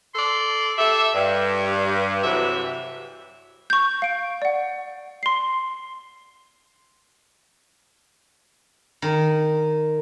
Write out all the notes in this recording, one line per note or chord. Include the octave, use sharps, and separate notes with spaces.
A4 D5 C6
G4 A4 E5
G2
C3 E3 F#3 A4 E5
C#6 G6
F5 D7
D5 F#5
C6 C7
D#3